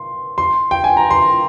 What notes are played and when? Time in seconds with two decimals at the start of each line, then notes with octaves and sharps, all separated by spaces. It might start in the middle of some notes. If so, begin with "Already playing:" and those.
Already playing: C6
0.38 C6
0.71 G5
0.84 G#5
0.97 A#5
1.11 C6